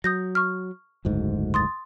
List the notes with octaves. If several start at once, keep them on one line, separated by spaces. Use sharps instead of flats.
F#3 D#6 G6 A#6
C#6 F6
F#1 D2 G#2
C6 D#6 A6